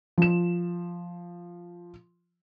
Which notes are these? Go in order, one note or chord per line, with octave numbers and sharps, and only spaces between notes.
F3 E7